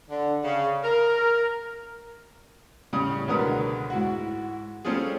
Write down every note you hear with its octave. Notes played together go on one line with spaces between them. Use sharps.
D3
C#3
A#4
A2 C#3 G3 C#4 D#6
C#2 B2 D3 B3 A#4 D#6
G#2 E4 F#4
G3 A3 C4 C#4 F4 G#4